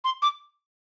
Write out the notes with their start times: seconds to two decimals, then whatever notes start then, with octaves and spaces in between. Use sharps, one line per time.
0.04 C6
0.22 D6